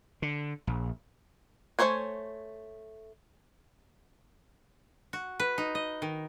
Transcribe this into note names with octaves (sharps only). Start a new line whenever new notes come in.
D3
A#1
A3 G#4 C5 C#5 G#5
F#4
B4
D#4
D#5
D#3